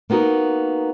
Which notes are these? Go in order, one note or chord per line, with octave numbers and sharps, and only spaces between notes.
A#3 B3 D#4 F#4 A#4